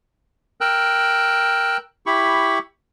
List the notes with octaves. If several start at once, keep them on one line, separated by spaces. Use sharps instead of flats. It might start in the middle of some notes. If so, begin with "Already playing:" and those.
A#4 G5 E6 F#6
E4 G4 B5 C#6